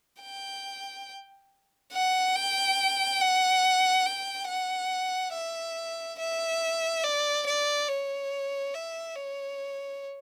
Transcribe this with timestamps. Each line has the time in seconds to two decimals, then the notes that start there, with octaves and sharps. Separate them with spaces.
0.22 G5
1.92 F#5
2.35 G5
3.21 F#5
4.05 G5
4.48 F#5
5.33 E5
6.19 E5
7.04 D5
7.47 D5
7.89 C#5
8.74 E5
9.16 C#5